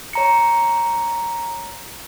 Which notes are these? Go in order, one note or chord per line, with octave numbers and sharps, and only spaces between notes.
C#5 A#5 C#7